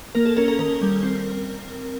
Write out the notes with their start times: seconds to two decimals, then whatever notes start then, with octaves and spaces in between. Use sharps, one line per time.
0.15 A#3 A#4
0.25 A4
0.37 C#4 A#4
0.48 A#4
0.59 D#3 A#4
0.82 G3
1.03 C4